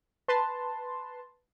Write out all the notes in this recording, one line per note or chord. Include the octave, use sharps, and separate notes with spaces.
B4 A5 C6